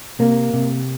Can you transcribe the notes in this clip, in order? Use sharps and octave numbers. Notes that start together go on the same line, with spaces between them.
C3 A#3
C3